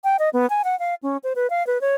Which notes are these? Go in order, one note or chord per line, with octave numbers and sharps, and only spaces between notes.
G5
D#5
B3
G#5
F#5
F5
C#4
C5
B4
F5
B4
C#5